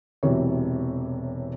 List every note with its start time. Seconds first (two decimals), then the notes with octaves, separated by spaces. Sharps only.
0.23 E1 C3 E3 F#3 C#5